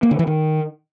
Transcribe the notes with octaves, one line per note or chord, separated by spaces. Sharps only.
A#3
D3
E3
D#3